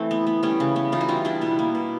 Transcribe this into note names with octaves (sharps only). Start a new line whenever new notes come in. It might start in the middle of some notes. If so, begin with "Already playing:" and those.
Already playing: E3 A3 C4
B3
B3
G3 B3 C#4
C#3
B3
E3 D#4 F4
E4 F#4
G3 D#4 F4
G3 D4 E4
B2 B3
A#3
B2